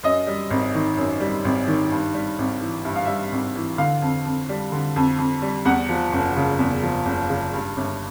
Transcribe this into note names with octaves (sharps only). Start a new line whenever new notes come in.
F#2 D#5
G3
G#1
D#3
F#2
G3
G#1
D#3
G2
G3
G#1
E3
G2 E5
F5
G3 E5
G#1
E3
D3 F5
F2
F2
G3
D3
F2
F2
G3
E2 F#5
F3
F#1
C#3
E2
F3
F#1
C#3
G2
G1